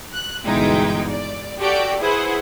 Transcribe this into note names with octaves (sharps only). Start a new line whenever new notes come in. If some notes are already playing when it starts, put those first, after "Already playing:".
F#6
G1 B2 E3 G#3 D#4 G5
D5
F#4 G4 A4 D5 G5
E4 G#4 B4 C5 F#5